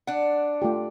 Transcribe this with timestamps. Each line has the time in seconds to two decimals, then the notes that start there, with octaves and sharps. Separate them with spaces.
0.07 D4 F#5
0.62 A3 F4 G4